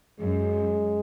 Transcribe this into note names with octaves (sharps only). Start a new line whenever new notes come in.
F#2 G#3